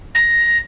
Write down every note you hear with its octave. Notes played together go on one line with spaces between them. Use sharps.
A#6